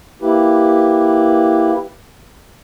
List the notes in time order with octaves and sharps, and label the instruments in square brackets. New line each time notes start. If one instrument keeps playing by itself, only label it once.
[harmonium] A#3 E4 G4 B4